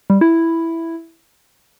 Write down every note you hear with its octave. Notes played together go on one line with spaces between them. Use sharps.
G3
E4